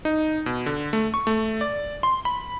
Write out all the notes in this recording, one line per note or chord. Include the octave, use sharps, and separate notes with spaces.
D#4
B2
D3
A3
C#6
A3
D5
C6
B5